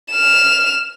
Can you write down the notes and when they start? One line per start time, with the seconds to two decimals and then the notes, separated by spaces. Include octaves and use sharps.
0.12 F6 E7